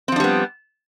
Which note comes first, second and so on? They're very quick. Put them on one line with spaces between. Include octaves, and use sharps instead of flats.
C4 F3 D4 G3 B3